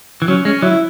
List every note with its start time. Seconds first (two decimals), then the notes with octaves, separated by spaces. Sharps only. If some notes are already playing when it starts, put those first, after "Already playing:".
0.22 E3
0.28 F#3 C#4
0.45 G#3 C#4
0.62 F#3 E4